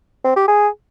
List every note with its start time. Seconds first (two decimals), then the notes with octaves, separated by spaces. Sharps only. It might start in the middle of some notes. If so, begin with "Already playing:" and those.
0.24 C4
0.36 G4
0.48 G#4